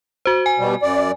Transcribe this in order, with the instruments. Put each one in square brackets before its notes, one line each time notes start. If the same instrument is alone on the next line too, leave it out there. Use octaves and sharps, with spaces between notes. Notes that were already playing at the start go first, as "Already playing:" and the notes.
[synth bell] F#4 C5
G#5
[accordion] B2 G3
F#2 D5